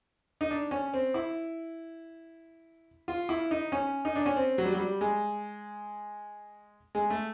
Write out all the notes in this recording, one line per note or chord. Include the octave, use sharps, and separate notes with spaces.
D#4
D4
C#4
C4
E4
F4
E4
D#4
C#4
D#4
D4
C#4
C4
F#3
G3
F#3
G3
G#3
G#3
A3